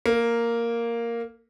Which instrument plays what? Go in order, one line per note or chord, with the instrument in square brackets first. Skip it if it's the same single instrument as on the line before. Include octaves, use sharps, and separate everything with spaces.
[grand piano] A#3